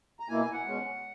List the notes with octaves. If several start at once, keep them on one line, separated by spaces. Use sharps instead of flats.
A#5
B2 A#3 E4 G#5
G#5
F#5
B2 G#3 C#4